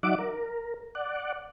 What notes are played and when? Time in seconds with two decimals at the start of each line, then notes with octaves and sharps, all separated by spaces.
0.03 F#3 D#4 D5 E5 F#5 D6
0.19 A#4
0.95 D5 F#5